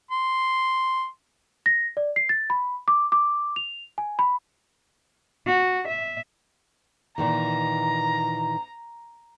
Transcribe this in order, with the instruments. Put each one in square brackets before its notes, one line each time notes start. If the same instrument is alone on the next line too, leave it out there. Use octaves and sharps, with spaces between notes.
[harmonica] C6
[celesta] A#6
D5
C7
A6
B5
D6
D6
F7
G#5
B5
[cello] F#4
E5
[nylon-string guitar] A#2 D#3 E3 [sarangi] A#5